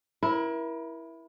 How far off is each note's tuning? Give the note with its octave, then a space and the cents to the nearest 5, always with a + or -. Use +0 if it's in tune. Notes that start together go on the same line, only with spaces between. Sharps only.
E4 +0 A#4 +35